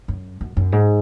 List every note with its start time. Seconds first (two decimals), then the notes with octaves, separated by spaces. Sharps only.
0.08 F#2
0.41 F#2
0.57 F#2
0.72 G#2